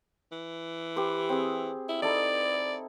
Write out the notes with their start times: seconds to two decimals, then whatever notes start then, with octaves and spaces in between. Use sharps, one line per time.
0.32 E3
0.96 G4 B4 C5
1.29 C4 G#4
1.89 E4
2.02 D#4 E4 A4 D5